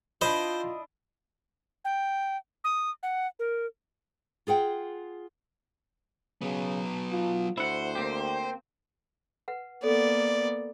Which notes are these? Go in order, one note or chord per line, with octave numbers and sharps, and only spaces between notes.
D4 E4 F4 C5 D#5 B5
G5
D#6
F#5
A#4
F4 G#4 F#5 G5
C#3 F#3 B3
F4
D2 E4 C5 F#5
A#3 C4 G4
B4 F#5
A#3 B3 A4 D5